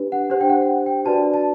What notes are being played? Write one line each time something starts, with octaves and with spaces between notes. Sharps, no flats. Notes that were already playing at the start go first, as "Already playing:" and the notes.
Already playing: D4 G4 B4
F#5
D4 G4 C5
G5
F#5
G5
D4 F#4 B4 D5 A5
A5